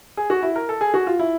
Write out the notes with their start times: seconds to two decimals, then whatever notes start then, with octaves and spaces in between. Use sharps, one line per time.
0.17 G#4
0.30 F#4
0.43 E4
0.56 A#4
0.69 A4
0.81 G#4
0.94 F#4
1.07 F4
1.19 E4